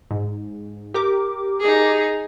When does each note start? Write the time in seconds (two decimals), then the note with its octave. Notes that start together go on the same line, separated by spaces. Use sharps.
0.11 G#2
0.94 G4 A#4 D6
1.60 D#4 G#4